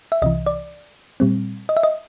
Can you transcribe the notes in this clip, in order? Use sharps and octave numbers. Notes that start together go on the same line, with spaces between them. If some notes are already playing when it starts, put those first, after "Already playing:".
E5
C2 C3 E3 D#5
D5
A#2 G3 C4
D#5
E5
D#5